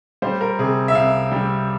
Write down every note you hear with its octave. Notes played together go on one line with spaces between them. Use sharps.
G3 C5
A#4
C3 G#4
E5
C2 F5
G3